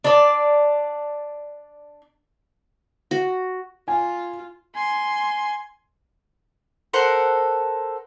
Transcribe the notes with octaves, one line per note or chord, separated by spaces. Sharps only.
D4 D5
F#4
F4 G#5
G#5 C6
A4 A#4 C5 F#5